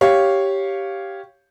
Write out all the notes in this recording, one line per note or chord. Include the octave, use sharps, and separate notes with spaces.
G4 C#5 F5